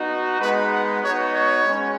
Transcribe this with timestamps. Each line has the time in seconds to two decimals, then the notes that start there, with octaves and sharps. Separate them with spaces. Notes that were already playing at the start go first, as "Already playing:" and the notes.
Already playing: B3 D#4 F#4
0.39 G#3 B3 D#4 B4
0.72 F#5
1.02 B3 D#4 F#4 C#5
1.34 C#5
1.64 G#3 C#4